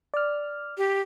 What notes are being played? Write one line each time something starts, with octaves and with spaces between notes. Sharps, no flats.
D5 F6
G4